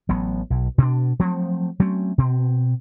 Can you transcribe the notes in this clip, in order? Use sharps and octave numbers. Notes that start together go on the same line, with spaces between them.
A1 F#3 B3
B1
B2 D4
F3 F#3 A3 C4
F#3 A3 C4 C#4
B2 C4